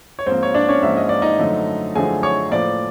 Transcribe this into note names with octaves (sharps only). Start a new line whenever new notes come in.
C#5
G#2 F3 A#3 C4 C5
C#5
D4 D5
C#4 C#5
G#2 F3 A#3 E5
D#5
D5
D#4 D#5
F#2 D3 F3 A3
F#2 D3 F3 A3 G#4 G#5
C#5 C#6
A2 F3 A#3 D5 D6